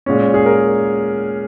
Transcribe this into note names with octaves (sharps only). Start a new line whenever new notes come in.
A#2 G#3 C#4
G#4
A#4